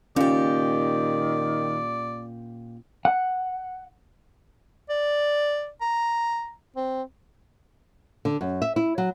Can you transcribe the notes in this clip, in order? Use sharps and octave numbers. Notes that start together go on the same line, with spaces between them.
A#2 D#3 C#4 G4 D5
F#5
D5
A#5
C4
D3
F#2
E5
E4
F#3